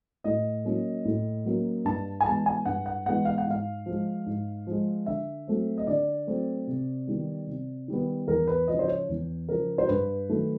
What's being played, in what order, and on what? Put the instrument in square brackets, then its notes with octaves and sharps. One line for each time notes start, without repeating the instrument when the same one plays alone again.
[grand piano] A2 D#5
F#3 A#3 C#4
A2
F#3 A#3 C#4
G2 A5
G#5
E3 G#3 B3 A5
G#5
G2 F#5
F#5
E3 G#3 B3 F#5
F5
F#5
G#2 F5
F3 G#3
G#2
F3 G#3
D3 E5
F#3 A3 C4
D#5
D3 D5
F#3 A3 C4
C3
D#3 G3 B3
C3
D#3 G3 B3
E2 A#4
B4
C#3 F3 D#5
C5
C#5
E2
C#3 F3 A#4
C5
G2 B4
D#3 F#3 A3